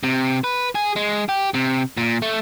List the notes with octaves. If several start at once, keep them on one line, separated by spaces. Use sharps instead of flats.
C3
B4
G#4
G#3
G4
C3
A#2
A3